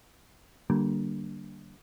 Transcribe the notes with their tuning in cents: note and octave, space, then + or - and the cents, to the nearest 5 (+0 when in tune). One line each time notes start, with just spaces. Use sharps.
D3 +0 G3 -30 A#3 +0